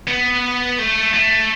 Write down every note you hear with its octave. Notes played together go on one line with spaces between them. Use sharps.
B3
A3
A3